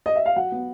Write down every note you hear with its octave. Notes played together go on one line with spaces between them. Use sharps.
D#5
E5
F5
F#3 F#5
B3